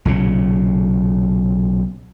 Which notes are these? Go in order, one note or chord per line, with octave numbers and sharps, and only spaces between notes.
B1 A#2 C#3